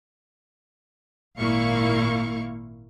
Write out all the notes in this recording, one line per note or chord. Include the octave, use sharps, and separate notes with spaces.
G#1 A#2 A#3 E4 F5 C#6